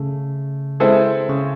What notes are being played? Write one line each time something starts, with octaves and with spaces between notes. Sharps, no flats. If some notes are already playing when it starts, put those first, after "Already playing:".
Already playing: C#3 A3
G#3 C4 E4 A4 C5
C#3